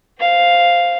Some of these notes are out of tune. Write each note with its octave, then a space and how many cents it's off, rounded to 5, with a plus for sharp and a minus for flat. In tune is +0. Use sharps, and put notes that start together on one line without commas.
C5 +0 F5 +0